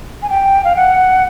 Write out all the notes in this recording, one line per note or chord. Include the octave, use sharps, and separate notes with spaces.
G#5
G5
F5
F#5